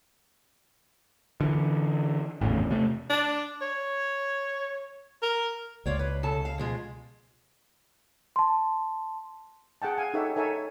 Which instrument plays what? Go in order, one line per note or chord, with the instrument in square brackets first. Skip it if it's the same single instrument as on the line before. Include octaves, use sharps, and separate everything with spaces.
[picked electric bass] D3 E3
G#1 E2 A2 C#3
C3 A3
[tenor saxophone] D4
C#5
A#4
[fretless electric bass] C#2 [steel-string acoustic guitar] F4 C#5 D5
[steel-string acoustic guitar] B4
C#3 A4 A5
F5
B2 F3 G#3
[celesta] A5 C6
[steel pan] G#4 F#5 G5 A5
F5 G#5
D#4 G4 A4 C#5 E5 F#5
D#4 A4 A#4 C#5 E5 G#5